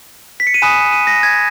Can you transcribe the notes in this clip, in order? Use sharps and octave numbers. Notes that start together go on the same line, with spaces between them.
B6
C#7
D#7
G#5 B5 D#6 F#6 E7
D#7
A#6
G#6